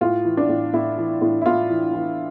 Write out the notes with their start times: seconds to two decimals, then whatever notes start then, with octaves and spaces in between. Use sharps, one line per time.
0.01 A2 F4
0.25 E3
0.37 D4
0.49 A2
0.73 A2 E4
0.98 E3
1.22 A2
1.41 E4
1.46 A2 F4
1.70 E3
1.94 E3